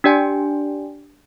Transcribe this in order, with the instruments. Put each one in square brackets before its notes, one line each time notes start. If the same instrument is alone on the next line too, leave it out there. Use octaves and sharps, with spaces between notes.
[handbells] D4 G4 D5 G5 G#5